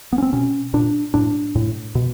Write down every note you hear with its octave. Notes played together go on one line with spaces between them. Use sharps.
B3
C#4
C4
B2 C#4
A#2 D4
A2 D4
A2
B2